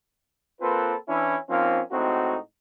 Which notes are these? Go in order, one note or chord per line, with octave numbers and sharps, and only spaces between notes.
A#3 C4 F4 A4 B4
E3 C#4 D4 E4
F3 A#3 C4 C#4 D#4 F4
A2 G#3 C4 D#4 F#4